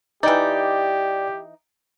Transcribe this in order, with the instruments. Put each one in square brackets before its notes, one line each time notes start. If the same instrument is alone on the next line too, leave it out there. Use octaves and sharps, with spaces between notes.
[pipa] E3 D#4 [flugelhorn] G4 [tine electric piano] D5 G5